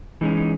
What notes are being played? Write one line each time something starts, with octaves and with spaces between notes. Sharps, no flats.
E3 G#3 C#4 D#4
D#4